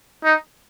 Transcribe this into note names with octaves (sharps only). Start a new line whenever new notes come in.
D#4